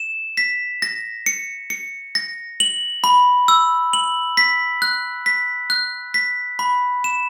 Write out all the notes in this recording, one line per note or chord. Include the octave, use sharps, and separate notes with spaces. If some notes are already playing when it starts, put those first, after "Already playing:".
Already playing: E7
B6
A#6
C#7
C#7
A#6
F#7
B5
E6
F#7
B6
F#6
B6
F#6
B6
B5
E7